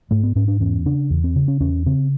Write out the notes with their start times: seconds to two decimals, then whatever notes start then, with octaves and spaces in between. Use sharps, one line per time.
0.11 G#2 A3
0.23 B3
0.36 G#2 C#4
0.48 D4
0.60 E2 C#4
0.86 C#3 D4
1.10 E2
1.24 C4
1.36 C#3
1.48 C#4
1.60 E2 C#4
1.86 C#3 C4